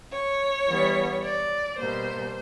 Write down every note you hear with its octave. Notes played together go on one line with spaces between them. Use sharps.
C#5
E3 G3 B3
D5
B2 G3 A#3 C5